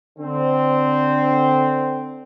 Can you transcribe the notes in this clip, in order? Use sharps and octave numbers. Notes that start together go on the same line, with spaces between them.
D3 C4